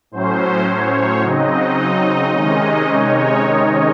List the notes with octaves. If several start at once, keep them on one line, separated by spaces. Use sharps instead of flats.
A2 F#3 C#4 C5
C#5
C#3 F#3 C4 D#4 D#5
D#4 D#5
C3 D#3 G#3 C#4 D#4 D#5
C#5